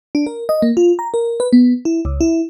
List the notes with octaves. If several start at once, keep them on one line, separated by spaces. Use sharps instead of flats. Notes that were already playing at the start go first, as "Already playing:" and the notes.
D4
A#4
D#5
A#3
F4
A#5
A#4
B4
B3
E4
C#2
E4